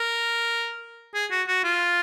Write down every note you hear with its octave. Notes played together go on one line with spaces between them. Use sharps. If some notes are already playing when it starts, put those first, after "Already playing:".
Already playing: A#4
G#4
F#4
F#4
F4